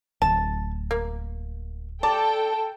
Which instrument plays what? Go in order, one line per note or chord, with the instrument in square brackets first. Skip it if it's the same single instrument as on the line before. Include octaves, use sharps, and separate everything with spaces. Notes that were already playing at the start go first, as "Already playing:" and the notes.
[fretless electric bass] D1 [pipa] A5
[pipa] A#3
[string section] A4 G5 [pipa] D5 [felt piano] A5